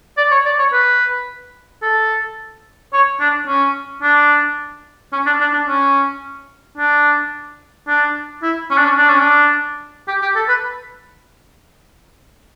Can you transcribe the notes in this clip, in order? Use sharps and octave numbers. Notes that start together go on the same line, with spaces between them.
D5
C#5
D5
C#5
B4
A4
C#5
D4
C#4
D4
C#4
D4
D4
D4
C#4
D4
D4
E4
C#4
D4
C#4
D4
C#4
D4
G4
G4
A4
B4